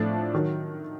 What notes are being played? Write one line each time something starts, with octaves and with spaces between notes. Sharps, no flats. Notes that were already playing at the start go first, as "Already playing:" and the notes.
Already playing: A2 F3 A3 D4
D#3 F#3